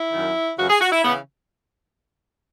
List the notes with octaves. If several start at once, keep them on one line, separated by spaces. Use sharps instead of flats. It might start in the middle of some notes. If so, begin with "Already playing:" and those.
Already playing: E4
F#2 D#3
F#2 C#3 E3 F#4
G#4
F#4
E4
C#3 E3 B3